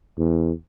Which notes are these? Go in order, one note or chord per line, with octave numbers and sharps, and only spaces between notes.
E2